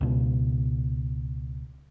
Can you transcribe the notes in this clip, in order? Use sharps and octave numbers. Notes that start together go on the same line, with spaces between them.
C#2 B2